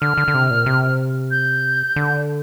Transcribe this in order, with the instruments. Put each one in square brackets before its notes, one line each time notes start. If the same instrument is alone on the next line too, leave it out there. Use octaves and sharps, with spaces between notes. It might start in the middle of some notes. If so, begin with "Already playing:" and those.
[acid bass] D3 [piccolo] F6
[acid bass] D3
D3
C3
A#2
C3
[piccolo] G6
[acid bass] D3